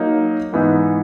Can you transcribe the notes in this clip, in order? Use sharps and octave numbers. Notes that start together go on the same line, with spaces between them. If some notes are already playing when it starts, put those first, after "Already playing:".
Already playing: F#3 A#3 D#4
G#2 E3 B3 D#4